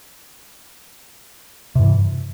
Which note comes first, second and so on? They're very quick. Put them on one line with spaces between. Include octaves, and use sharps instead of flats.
C3 G2 E3